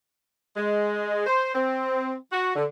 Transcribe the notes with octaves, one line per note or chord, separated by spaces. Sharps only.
G#3
C5
C4
F#4
D3